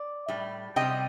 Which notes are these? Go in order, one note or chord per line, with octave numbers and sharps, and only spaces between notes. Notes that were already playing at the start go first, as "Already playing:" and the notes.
Already playing: D5
A2 G3
C3 G3 D#5 G5